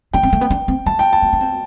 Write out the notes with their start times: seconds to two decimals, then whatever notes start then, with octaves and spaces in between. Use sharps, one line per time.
0.14 D4 G5
0.23 C4
0.33 A3
0.41 B3
0.50 D4
0.68 C4
0.86 A3 A5
0.99 G5
1.13 A5
1.22 B3
1.33 D4
1.41 C4